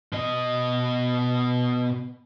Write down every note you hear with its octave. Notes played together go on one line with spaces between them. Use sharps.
B2 D#5